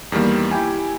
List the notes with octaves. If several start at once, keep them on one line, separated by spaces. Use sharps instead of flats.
E2 D#3 G3 A#3
E4 G4 G5 G#5